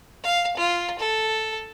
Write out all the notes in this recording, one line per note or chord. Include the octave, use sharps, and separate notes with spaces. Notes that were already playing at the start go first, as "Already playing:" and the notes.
F5
F4
A4